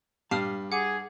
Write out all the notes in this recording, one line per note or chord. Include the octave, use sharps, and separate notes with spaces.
G2 G4 F5 A5 D#6 F6 C7
G#4 F#5 D6